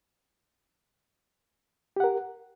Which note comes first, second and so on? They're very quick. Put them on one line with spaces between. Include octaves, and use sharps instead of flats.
G4 F#5 A#4